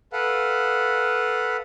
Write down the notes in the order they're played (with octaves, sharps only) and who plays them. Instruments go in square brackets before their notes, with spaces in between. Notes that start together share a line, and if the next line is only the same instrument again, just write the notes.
[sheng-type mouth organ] A4 B4 F5 F#5